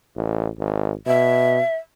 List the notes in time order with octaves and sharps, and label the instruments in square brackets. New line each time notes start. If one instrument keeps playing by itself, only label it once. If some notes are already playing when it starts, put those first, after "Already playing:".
[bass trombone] A1
G#1
[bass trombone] B2 [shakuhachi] E5